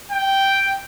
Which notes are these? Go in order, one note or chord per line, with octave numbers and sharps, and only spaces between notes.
G5